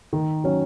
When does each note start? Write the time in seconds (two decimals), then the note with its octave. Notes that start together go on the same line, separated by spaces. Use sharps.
0.13 D#3
0.44 F#3 C#4